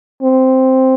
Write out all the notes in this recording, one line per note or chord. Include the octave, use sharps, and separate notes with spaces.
C4